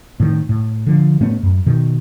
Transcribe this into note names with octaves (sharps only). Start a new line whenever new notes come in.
A2 D#3
A2
D3 F3
A2 A3 B3 C#4
F#2
B2 D#3